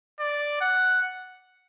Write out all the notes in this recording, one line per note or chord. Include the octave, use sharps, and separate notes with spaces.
D5
F#5